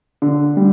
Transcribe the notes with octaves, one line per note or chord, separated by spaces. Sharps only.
D3
G3